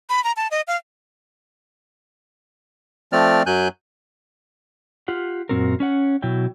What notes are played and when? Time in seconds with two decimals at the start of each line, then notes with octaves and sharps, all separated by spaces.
0.09 B5
0.24 A#5
0.37 A5
0.51 D#5
0.68 F5
3.12 F3 A3 C4 D5 F6
3.46 F#2 F#3 G#5 F#6 G6
5.08 F4 G4 F#5
5.49 F#2 A#2 C4 F#4 A#4
5.80 C#4 C#5 F#5
6.22 B2 F#3 E4 G5